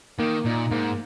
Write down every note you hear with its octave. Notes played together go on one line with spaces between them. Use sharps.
D#3 A#3
A#2 D#4
G#2 A#3